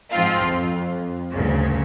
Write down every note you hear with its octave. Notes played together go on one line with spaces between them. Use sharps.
G#2 F3 C4 F4
F2
D2 G2 A#2 C#3